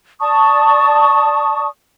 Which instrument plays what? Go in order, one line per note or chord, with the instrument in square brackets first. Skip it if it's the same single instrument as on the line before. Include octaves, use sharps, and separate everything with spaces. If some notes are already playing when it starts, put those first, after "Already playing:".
[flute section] D5 A5 C#6 D#6